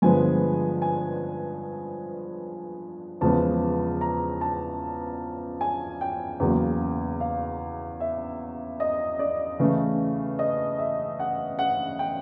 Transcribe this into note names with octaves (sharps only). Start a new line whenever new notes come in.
G2 D3 F3 G#3 B3 G#5
G#5
E2 C#3 F3 G#3 B3 A5
A#5
A5
G#5
G5
E2 C#3 F#3 A#3
F5
E5
D#5
D5
C#3 E3 A3
D#5
E5
F#5
F#5
G5